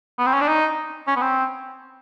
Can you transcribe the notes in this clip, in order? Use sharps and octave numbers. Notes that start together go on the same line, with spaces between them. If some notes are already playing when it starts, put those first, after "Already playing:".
B3
C4
C#4
D4
D#4
C#4
B3
C4